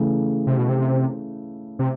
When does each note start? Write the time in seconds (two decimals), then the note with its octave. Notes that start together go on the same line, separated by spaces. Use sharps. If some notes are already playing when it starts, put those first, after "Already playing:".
Already playing: C#3 E3 A3
0.47 C3
0.58 B2
0.69 C3
1.79 C3